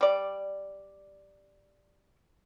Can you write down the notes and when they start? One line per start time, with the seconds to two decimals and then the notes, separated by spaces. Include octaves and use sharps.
0.01 G3 D5